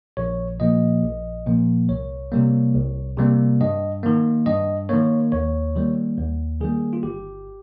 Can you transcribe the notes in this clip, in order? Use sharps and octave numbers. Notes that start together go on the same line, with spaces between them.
A#1 C#5
A#2 F3 A#3 D#5
A#1
A#2 F3 A#3
C2 C#5
C3 G3 A#3
C2
C3 G3 A#3
G2 D#5
D#3 A#3
G2 D#5
D#3 A#3 C#5
D#2 C#5
D#3 G3 A#3
D#2
D#3 G3 A#3 G#4
F4
G1 G4